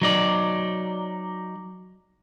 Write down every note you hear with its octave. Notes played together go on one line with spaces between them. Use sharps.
F#3 D#4 D5